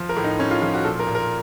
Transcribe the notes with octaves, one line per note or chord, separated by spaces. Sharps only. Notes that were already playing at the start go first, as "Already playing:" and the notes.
Already playing: F3
A#4
A2
D#4
A2 C#4
F4
F3 F4
F#4
A#2 A4
A#4
A#2
A#4